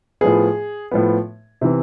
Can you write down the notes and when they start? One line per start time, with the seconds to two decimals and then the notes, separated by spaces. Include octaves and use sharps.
0.21 A2 F3 B3 G#4
0.91 A2 F3 B3
1.61 C3 E3 B3